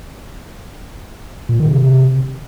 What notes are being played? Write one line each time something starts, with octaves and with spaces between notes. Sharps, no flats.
A#2
D#3
C3